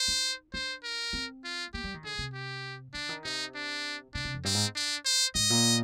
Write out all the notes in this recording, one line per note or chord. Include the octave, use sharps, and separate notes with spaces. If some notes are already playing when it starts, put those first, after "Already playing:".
Already playing: C5
D#4
D4 C5
A#4
C4
F4
A#3 G4
G3
D#3
D3 G#4
C3
G4
D3 D4
D#3
C3 D#4
D4
C3 D4
C3
F2
G2 C4
G#2
D4
C5
G#2 D#5
A#2